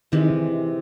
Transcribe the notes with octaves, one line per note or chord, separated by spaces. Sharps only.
C3 D#3 E3 G#3